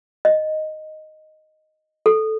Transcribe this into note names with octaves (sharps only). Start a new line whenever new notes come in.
D#5
A4